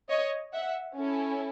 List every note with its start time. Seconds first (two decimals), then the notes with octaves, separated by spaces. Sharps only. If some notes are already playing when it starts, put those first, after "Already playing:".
0.09 C#5 D#5
0.53 E5 F#5
0.97 C#4 E4 A4